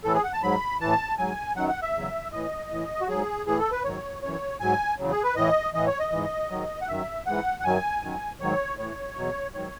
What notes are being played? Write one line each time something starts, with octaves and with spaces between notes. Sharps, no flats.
A2 E3 A4
G#4
F#5
A5
G#2 F#3 B5
A2 E3 A5
G#2 F#3 G#5
F#2 D#3 F#3 F#5
F#5
E5
E2 C#3 F#3
A2 E3 D#5
A2 E3
F#4
G#2 F#3 G#4
A2 E3 G#4
A4
B4
G#2 D#3 F#3 C#5
F#2 E3 C#5
G#2 F#3 G#5
E2 C#3 F#3
G#4
B4
A2 E3 D#5
A2 E3 D#5
C#5
D#5
G#2 E3
G#2 D#3 F#3
F#5
F#2 D#3 F#3 E5
G#2 E3 F#5
F#5
F#2 D#3 F#3 G#5
F#2 D#3 F#3
G#2 D#3 F#3 C#5
A2 E3 C#5
E2 B2 F#3
G#2 D#3 F#3 C#5